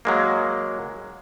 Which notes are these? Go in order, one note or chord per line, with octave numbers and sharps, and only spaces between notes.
F#3 G#3 A#3